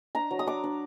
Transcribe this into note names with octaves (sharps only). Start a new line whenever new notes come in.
D4 A#5
F#3
D#6
D4 D6
D4